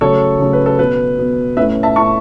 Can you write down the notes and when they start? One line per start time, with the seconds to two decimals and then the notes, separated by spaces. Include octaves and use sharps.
0.01 C#3 F#3 A3 C#4 A4 C#5
0.39 C#3 F#3 A3 C#4
0.53 B4
0.66 A4
0.79 B2 B3 B4
1.18 B2 B3
1.57 A2 A3 C#4 B4 E5
1.83 E5 A5
1.96 A2 A3 C#4 A5 C#6